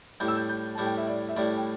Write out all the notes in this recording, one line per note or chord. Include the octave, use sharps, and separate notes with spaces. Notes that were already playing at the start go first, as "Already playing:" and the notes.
A2 G3 E4 G6
E6
G6
G6
A2 G3 E4 A5
G5
E5
D5
E5
A2 G3 E4 D5
G5